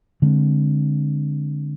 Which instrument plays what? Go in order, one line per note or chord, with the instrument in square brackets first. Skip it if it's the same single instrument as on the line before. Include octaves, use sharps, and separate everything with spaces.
[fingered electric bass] D3 G#3 C4